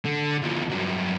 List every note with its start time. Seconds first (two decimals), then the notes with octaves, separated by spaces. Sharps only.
0.05 D3
0.42 D#2 F3
0.70 G2 F#3